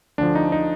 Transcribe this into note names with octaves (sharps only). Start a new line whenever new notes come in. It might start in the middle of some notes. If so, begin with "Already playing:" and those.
D2 D3 F3 D4
D#4
D#4